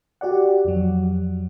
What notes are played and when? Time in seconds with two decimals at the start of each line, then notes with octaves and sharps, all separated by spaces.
0.21 F#4 G4 D5 F#5
0.65 F2 F#3